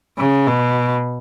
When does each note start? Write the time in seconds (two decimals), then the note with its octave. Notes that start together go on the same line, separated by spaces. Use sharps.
0.18 C#3
0.48 B2